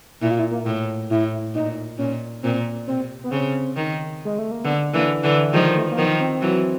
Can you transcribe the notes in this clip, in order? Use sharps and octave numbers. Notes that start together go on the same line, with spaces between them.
A#2 E4
F4
E4
A#3
A2
A2 E4
A#2 D#4
A#2 C#4
A#2 C4
C3 C4
B3
C#3 C4
D#3
G#3
A3
A#3
D3 B3
D3 E3 A#3
D3 E3
D#3 F3 G#3
A3
A#3
D#3 F3 B3
C4
E3 F#3